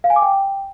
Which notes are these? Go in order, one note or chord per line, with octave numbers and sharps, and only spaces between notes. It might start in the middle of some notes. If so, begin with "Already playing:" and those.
F5
G#5
D6
G5